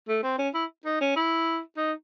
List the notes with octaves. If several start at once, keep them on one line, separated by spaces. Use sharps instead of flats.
A3
C4
C#4
E4
D#4
C#4
E4
D#4